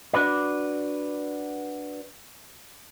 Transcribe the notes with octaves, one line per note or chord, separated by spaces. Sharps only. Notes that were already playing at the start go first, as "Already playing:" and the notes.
D4 F#4 B4 D5